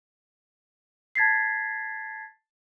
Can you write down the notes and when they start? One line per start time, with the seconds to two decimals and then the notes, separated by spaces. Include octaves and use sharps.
1.15 A5 G#6 A6 B6 C7